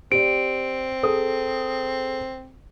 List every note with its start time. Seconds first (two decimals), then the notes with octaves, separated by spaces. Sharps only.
0.12 C4 G4 D5 D7
1.03 G#4 A4 D#6